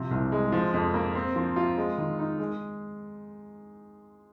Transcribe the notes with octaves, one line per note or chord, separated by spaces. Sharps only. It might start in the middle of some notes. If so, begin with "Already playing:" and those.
Already playing: C3 F3
C2
G#3
F3
F2
A#3
C4
F3
F4
G#3
D#3
D#4
G#3